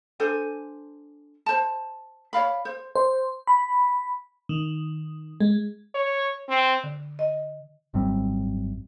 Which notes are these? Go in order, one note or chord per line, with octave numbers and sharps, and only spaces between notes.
D4 A4 C5 G#5
C5 A5
C#5 D5 F5 B5
C5
C5
B5
D#3
G#3
C#5
C4
D3
D#5
G#1 F#2 G3 C4